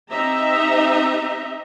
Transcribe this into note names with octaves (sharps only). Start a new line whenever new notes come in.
C4 D#4 G4 D#5 E5 A#5